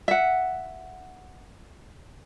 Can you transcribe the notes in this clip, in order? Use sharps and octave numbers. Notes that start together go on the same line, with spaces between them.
E5 F#5